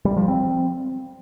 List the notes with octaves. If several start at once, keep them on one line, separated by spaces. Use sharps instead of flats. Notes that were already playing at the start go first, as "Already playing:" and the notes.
G3
F3
C4